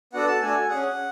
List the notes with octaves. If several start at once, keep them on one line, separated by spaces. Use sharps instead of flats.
B3 D4 F#4 A4 F#5
A5
A3 D4 F#4 A4 G#5
C#4 G#4 F#5